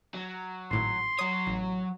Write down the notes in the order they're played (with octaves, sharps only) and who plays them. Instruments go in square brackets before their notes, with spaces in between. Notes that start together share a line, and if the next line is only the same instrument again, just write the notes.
[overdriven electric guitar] F#3
[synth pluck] G#1 A2 [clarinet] C6
[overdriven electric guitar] F#3 C#5 [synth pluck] D#6
[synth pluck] A1